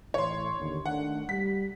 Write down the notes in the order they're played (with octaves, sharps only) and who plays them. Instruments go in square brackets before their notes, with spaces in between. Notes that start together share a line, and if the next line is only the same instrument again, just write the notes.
[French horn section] A2 E3 [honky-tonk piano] C#5 C6
[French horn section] D#2 D3
[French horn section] D#3 A3 D4 [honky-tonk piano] F#5
[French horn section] G3 [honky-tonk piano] B6